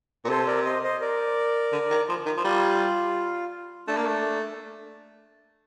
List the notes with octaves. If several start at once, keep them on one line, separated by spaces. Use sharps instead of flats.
A#2
C3 A4 C5
A#4 D5
C5 D#5
C5 D#5
A#4 D5
D3
D#3
F3
D#3
F3
G3 F4
A3 D4
A#3
A3